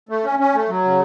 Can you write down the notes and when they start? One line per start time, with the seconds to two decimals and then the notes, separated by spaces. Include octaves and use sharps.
0.09 A3
0.24 C#4
0.39 C#4
0.54 A3
0.69 F#3
0.84 C#3